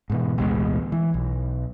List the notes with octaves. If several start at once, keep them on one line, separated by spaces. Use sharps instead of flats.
G#2 B2 E3
A1 D2 B2 G#3
E3
B1